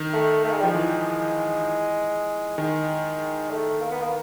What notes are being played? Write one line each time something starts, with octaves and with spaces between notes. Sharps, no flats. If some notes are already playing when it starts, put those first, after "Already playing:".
Already playing: D#3
A3
A3
G#3
G3
F3 G#3
E3
D#3 G#3
A3
A#3
B3
A#3